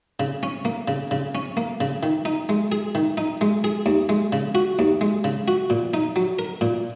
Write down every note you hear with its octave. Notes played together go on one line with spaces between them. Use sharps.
C#3
C#4
A#3
C#3
C#3
C#4
A#3
C#3
D#3
D#4
G#3
G#4
D#3
D#4
G#3
G#4
D#2
G#3
C#3
F#4
D#2
G#3
C#3
F#4
A#2
D#4
F#3
A#4
A#2